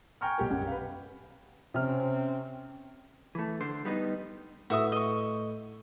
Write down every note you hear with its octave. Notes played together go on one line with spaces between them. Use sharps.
G5 G#5 A#5 C#6 F6 G6
B1 G4 A#4
B1 F#2 G4 F#5 G#5
B4 F5
C3 C4 C#4 F6
E3 A3
D3 C5
G3 B3 D#4
A2 F#4 B4 E5 D#6
D#5 C#6